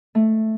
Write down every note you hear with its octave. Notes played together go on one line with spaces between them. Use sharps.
A3